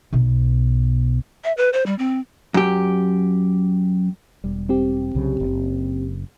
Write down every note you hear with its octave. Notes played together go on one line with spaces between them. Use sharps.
B1 B2
E5
B4
C5
G3
C4
F#2 G4
E1 G3
C4 G4
C2 C#3 F#3
F#1